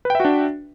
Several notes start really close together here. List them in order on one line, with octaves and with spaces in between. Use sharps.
B4 G5 E5 F#4 D4